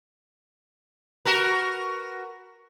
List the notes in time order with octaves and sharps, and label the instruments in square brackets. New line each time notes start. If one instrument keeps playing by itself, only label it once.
[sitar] F#4 A#4 B4